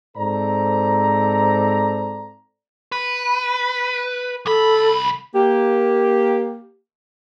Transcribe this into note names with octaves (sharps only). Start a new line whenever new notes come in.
G#2 C4 A4 C5 D5 A#5
B4
C2 A4 B5
A#3 G4